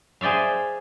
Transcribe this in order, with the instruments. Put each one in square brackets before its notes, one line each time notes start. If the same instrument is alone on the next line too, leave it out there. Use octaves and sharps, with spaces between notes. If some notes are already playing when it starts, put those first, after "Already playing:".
[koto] G#4 C5 D5 E5 F5